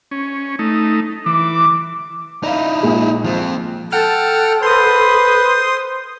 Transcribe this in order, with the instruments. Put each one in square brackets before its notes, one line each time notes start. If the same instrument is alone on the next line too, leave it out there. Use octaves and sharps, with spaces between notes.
[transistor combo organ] C#4
A3 D#4
[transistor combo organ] E3 [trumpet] D6
[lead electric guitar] D#4 E4 [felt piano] D5 F5
[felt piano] A#1 A#2 G#3
[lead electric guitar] F3 C4
[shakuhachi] A4 [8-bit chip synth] F#5 G5 F6 [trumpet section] A5
[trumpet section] B4 [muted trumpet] C5 [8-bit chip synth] C6 D#6